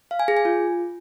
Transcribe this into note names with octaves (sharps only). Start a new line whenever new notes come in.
F5
G#5
G#4
G#5
F4